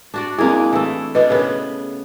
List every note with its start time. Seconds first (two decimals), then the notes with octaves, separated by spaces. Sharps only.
0.14 D4 F#4 D5
0.38 G#3 A#3 C4 E4 G#4
0.73 E3 A3
1.15 B2 D4 B4 D#5
1.30 C#3 B3 G#4 A#4